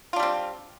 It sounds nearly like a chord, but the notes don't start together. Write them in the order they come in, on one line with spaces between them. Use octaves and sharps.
F4 D4 G3 C4